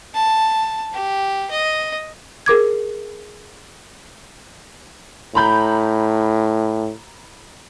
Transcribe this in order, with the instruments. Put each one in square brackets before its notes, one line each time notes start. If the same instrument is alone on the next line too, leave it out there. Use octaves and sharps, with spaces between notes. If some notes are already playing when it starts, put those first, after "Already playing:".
[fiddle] A5
G4
D#5
[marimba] G#4 A#4 D6 G#6
[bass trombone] A2 [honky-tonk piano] A#5 B5 G6